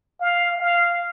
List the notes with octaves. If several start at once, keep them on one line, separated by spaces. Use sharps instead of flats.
F5
F5